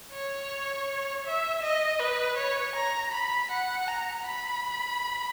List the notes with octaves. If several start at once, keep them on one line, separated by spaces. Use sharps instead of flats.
C#5
E5
D#5
B4
C#5
A#5
B5
F#5
A#5
B5